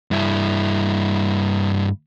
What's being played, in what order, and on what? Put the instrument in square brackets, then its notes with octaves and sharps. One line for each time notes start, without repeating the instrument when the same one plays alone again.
[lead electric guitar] G2 E4